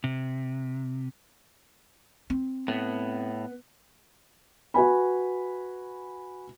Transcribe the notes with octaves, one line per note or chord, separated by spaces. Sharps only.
C3
C4
A2 B3
F#4 B4 G#5 B5